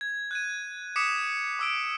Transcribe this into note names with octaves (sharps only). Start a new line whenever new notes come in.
G#6
F#6 G#6 D#7
D6 D#6 B6 C#7 E7
D6 E6 D7